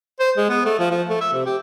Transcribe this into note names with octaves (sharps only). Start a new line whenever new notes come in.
C5
G#3
B3
A3
F3
F3
A3
E5
C3
G4